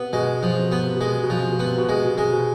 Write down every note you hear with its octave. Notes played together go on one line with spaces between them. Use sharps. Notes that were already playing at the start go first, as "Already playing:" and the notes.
Already playing: C3 B3
B2 G#3
B2 F3
C3
B2 B3
C3
B2 G#3
C3
B2
F3
C3
B2
B3
C3
B2
C3 G#3
B2
C3 G#3
B2